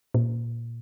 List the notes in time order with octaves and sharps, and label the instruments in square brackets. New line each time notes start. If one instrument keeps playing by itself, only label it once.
[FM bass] A#2